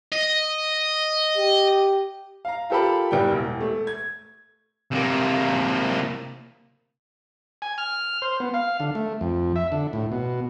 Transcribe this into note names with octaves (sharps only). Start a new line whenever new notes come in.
D#5
G4
F5 A#5
F4 G4 A4 A#4 B5
F#1 G3 G5
E1
A3
G#6
C3 A#3
G#5
F6
C5
B3
F5
D3
A3
F2
E5
D3
A2
B2